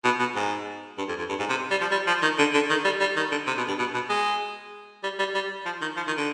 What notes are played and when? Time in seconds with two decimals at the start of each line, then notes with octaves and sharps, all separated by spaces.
0.04 B2
0.19 B2
0.35 G#2
0.98 G2
1.08 F2
1.18 F2
1.29 G2
1.39 G#2
1.49 C3
1.71 G3
1.81 F3
1.91 G3
2.07 F3
2.22 D#3
2.38 D3
2.54 D3
2.70 D#3
2.84 G3
3.00 G3
3.16 D#3
3.31 D3
3.47 C3
3.58 B2
3.68 G2
3.79 B2
3.94 B2
4.10 G#3
5.03 G3
5.19 G3
5.35 G3
5.65 F3
5.81 D#3
5.96 F3
6.07 D#3
6.17 D3